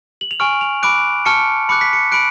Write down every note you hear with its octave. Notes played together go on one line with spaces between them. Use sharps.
F#7
F7
G#5 C#6 F6 D7
F7
B5 D6 F#6 D7
A5 C#6 F6 C#7
B5 D6 F#6 C#7
B6
C#7
B5 F#6 D7